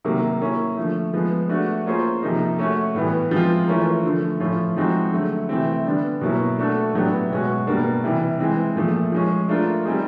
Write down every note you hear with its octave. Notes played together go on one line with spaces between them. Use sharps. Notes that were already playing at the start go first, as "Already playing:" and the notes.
C3 D#3 F#3 A#3
A#3 C#4 E4
D3 F3 A3
F3 G#3 B3
A3 D4 F#4
A#3 C#4 F4 G#4 C5
C3 F3 A#3 D#4
A3 C#4 F#4
A2 E3 G3 B3
F3 G#3 C4 F4
E3 A3 C#4 F4 A#4
D3 F3 A3
A2 F3 A3 C#4 F4
F3 G#3 C4 D#4 F#4
D3 F#3 A3
C3 E3 A3 C4
D3 G3 B3 D4
B2 F#3 A#3 C#4 E4
A3 D4 F#4 A4
A2 F#3 B3 D4 G4
B2 G#3 C#4 F#4
B2 G3 A#3 D4
C3 E3 G3
E3 G#3 C4
A#2 F3 A3
F3 G#3 C#4
A3 D4 F4 A#4
G3 C4 D#4 G#4